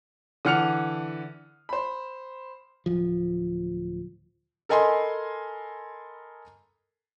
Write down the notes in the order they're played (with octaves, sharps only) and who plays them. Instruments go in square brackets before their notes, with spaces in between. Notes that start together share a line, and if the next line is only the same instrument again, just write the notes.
[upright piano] D3 E3 F#5 F6 C#7 F7
C5 B5
[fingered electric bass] D1 F3
[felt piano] A4 A#4 D#5 G#5 B5 C6